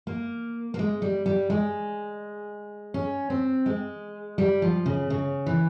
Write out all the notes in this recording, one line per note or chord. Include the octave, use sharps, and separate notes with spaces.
A#3
A#3
G#3
G3
G3
G#3
C#4
C4
G#3
G3
F3
C#3
C#3
E3